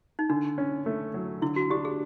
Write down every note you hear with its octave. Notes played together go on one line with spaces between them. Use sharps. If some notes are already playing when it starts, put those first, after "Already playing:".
D#4
D3 D4
C#4
A3
F#3
D3 E4
F#4
D4 G4
G#4